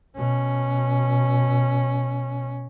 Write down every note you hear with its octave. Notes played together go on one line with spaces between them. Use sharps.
B2 C#4